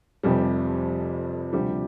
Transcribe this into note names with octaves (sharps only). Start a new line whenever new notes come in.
F1 F2 C3 F3 G3 G4
D2 C3 F3 G3 G4